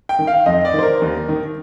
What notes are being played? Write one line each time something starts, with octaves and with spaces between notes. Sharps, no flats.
G5
D#3
F5
F2 D#5
D5
D#3
C5
A#4
D#2
D#3